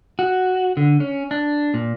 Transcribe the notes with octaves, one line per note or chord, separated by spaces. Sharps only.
F#4
D3
C#4
D4
A#2